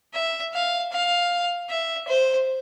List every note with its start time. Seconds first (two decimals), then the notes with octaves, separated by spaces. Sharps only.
0.14 E5
0.53 F5
0.92 F5
1.69 E5
2.08 C5